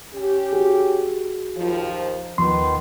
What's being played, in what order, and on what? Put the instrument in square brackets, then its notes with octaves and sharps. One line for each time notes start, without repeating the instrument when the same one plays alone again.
[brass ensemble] C#4 G4
[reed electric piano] F#4 G#4
[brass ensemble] D#2 F3
[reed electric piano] D#2 F3 C6 [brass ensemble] D#3 B3